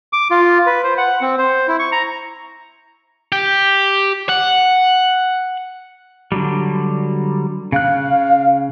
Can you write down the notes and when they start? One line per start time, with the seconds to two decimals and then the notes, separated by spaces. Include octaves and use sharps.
0.13 D6
0.31 F4
0.67 B4
0.84 C5
0.97 F#5
1.22 C4
1.38 C5
1.68 E4
1.79 C#6
1.92 A#5
3.32 G4
4.29 F#5
6.32 D3 F#3 G3
7.72 C#3 F5 F#6